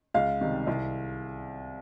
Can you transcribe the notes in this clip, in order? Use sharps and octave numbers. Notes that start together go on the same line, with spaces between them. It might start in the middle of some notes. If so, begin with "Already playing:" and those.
C#2 F5
C3 D#3 G3
C2